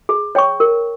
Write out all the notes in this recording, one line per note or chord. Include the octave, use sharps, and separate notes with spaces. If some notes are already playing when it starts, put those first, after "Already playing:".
G#4
C#5 G5 C#6
A#4